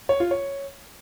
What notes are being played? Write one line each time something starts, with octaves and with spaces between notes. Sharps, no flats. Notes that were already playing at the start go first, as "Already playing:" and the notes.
C#5
F4
C#5